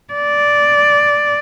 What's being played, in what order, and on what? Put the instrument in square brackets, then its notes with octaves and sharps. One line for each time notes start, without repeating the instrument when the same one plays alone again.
[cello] D5